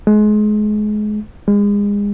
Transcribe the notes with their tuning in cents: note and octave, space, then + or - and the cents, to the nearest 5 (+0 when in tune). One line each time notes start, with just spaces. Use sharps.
G#3 +30
G#3 -30